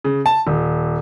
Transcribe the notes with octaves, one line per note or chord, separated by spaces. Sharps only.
C#3
A5
D#1